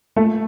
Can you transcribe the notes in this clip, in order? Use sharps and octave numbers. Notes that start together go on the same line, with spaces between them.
A3